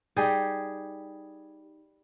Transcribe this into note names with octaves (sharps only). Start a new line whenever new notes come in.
G3 D#4 G4 G#4